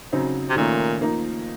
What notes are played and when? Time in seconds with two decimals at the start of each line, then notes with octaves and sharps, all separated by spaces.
0.12 C#3 F#3 C4 D#4
0.50 C3
0.56 A#2 D#3 A3 C#4
1.01 F3 A#3 D#4